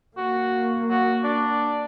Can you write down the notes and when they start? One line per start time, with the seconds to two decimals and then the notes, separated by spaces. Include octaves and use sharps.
0.17 A#3 F#4
0.90 F#4
1.24 D4